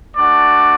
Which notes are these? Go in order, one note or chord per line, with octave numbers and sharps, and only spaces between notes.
A3 D4 F#4 D5